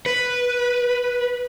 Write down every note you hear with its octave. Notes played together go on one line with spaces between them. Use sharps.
B4